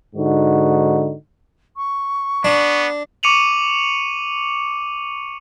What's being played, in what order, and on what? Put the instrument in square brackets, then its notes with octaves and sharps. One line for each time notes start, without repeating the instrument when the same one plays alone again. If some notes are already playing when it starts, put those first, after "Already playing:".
[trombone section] G#2 D3 D#4 F#4
[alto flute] C#6
[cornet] B3 [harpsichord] D4
[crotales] C#6 D6 C#7 D#7 F7 F#7